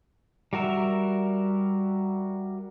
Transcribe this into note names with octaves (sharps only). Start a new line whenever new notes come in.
G3 F#4 A#4 E5